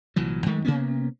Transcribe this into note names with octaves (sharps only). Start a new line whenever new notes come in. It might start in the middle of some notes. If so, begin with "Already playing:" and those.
C2 A#2 E3 F#3
F#2 D#3 G#3 A3
C3 A#3 B3 C#4